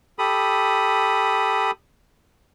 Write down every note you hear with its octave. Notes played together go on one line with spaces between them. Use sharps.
G4 A4 B5 D#6